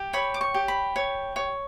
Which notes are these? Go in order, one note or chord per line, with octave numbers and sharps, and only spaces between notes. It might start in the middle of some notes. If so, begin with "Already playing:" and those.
Already playing: G4
C#5 B5
D6
C#6
G4
B5
C#5
C#5